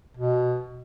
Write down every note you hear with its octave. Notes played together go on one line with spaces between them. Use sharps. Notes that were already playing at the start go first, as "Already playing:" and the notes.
B2